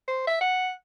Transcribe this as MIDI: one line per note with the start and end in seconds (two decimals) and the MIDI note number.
0.08 0.23 72
0.27 0.37 76
0.41 0.70 78